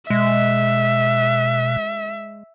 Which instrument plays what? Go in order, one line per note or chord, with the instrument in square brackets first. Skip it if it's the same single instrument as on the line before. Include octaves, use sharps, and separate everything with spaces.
[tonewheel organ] B2 [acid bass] G#3 [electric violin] E5